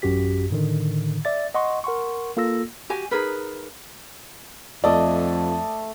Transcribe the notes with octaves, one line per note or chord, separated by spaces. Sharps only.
A1 F#2 F#4 G4 B6
A2 D3 D#3
D5 E5 A6
D#5 F#5 C6 C#6
A#4 F#5 C6 C#6
A#3 F4 A4 E6 A#6
F#4 G4 G#5
D#4 G#4 A#4 B4
F2 A3 D5 D#5